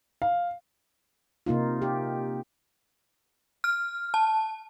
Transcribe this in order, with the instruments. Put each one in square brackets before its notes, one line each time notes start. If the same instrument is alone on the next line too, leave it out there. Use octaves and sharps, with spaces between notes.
[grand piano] F5
[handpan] C3 A#3 D#4 F4
G4
[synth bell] F6
A5